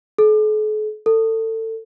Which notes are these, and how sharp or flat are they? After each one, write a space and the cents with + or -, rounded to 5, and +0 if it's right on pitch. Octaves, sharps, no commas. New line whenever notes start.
A4 -45
A4 +25